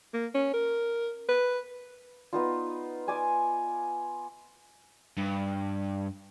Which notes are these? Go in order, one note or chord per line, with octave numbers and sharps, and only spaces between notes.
A#3
C#4
A#4
B4
B3 D#4 F4
G#5 A5 D6 D#6
G2